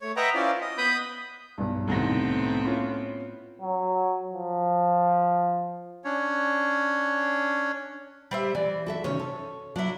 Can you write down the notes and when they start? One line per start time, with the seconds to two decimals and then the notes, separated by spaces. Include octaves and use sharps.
0.01 A3 C#5
0.16 B4 D#5 E5 F#5 G5 A#5
0.34 C#4 E4 F4 C5 D5
0.61 D#5
0.78 B3 B4 B5 D#6 G6
1.58 B1 G2
1.88 C2 A2 D#3 B3 C4 A#6
2.65 C#4 E4 F4
3.62 F#3
4.33 F3
6.04 C#4 D4 C#5
8.31 G3 C5 E5
8.55 E3 D5
8.86 F#4 A4 E5
9.04 C3 D#3 C#4 C#5
9.19 A4
9.76 F#3 D4 E4